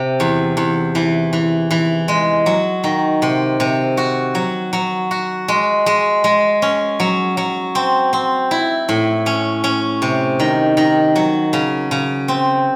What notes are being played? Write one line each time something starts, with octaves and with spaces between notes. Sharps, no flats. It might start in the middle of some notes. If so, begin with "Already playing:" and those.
Already playing: C3
E2
E2
E3
E3
E3
G#3
F#3
D#3
C3
C3
F#4
F#3
F#3
F#4
G#3
G#3
G#3
C#4
F#3
F#3
C4
C4
E4
A2
C#4
C#4
C3
D#3
D#3
F#3
C#3
C#3
C4